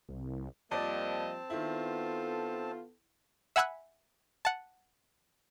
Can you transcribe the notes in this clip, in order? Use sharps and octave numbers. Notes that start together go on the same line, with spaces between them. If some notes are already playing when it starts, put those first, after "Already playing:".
C2
F2 F3 G3 A#3 C4 D5 D#5 A5
D#3 B3 E4 F4 A4
E5 F#5 G#5 B5 E6 F#6
F#5 A5